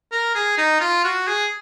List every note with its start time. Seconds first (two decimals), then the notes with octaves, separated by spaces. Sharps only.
0.12 A#4
0.35 G#4
0.57 D#4
0.80 F4
1.04 F#4
1.27 G#4